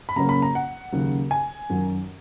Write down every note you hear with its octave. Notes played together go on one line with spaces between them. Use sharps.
B5
C#3 F#3 A#3 C#4 A#5
B5
A#5
F#5
D#2 C#3 F#3
G#5
F#2 D#3 F#3